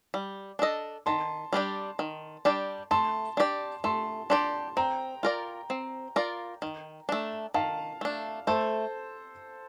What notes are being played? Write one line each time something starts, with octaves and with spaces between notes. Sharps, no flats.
G3
D4 A4 D#5
D#3 A5 C6
G3 D4 G4 D5
D#3
G3 D4 G4 D5
A3 A5 C6
D4 G4 D5
A3 A5 C6
D4 G4 D5 A5 C6
C4 G5 A#5
F4 A#4 D5
C4
F4 A#4 D5
D#3
A3 D4
D#3 F5 A5
A3 D4
A3 A4 C5